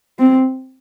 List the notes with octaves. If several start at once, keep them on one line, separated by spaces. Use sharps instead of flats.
C4